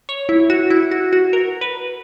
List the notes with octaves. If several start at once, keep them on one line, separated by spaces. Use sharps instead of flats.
C#5
E4
F#4
E4
F#4
F#4
A#4
B4